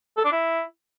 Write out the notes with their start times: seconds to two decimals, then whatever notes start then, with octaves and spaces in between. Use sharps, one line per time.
0.17 A4
0.24 D4
0.32 E4